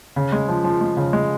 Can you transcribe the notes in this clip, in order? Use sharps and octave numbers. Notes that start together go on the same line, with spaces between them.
C#3
G#3
F3
F3
G#3
C#3
G#3